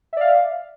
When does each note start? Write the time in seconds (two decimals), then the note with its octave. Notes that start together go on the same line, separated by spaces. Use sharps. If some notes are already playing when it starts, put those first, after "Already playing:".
0.13 E5
0.17 D5
0.21 F5